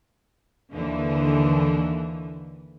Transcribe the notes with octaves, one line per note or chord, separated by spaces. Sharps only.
D#2 D3 E3